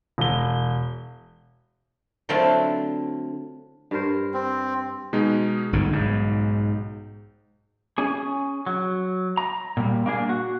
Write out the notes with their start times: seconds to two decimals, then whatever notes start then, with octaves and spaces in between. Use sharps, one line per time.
0.18 E1 G7
2.29 D3 F#3 A3 C4 E4 F4
3.91 G2 A#4 C5
4.34 C4
5.13 B2 G#3 D#4
5.73 G1 G#2 D3
5.93 B1 G#2
7.98 C#4 G#4
8.66 F#3
9.37 A#5
9.77 A#2 G3
10.06 A#3 D4 G#4
10.29 F#4